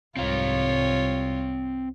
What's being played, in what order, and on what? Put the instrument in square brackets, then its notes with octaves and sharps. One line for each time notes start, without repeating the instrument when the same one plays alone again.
[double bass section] C2 G#2 [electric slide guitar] C4 F5 [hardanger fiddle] F4 C#5